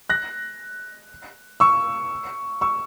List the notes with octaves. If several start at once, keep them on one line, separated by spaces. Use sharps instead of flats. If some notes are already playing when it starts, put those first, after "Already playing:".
F#6 A#6
C#6 E6
C#6 E6